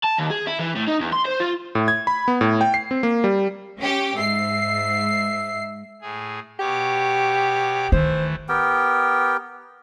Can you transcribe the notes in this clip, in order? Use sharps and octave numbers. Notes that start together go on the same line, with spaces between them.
A5
D#2
G#4
E4
E3
A2
D#4
E2
C6
C5
F4
A2
G#6
B5
B3
A2
G5
C7
C4
A#3
G3
C#4 G4
G#2 E5 C7
A2 G#4
B2 G4 C#5 D6
D#3 E3 A3 C5
B3 G4 A#4 G5